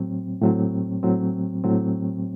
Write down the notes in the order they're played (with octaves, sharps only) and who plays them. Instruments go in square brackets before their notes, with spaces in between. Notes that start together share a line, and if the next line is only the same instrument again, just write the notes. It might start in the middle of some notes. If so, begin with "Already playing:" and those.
Already playing: [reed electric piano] A2 F#3 C4
A2 F#3 C4
A2 F#3 C4
A2 F#3 C4